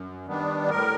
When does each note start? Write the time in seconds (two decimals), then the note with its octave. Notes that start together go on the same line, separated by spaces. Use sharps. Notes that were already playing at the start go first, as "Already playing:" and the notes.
Already playing: F#2
0.26 D#3 G3 B3 D4
0.70 A2 A#4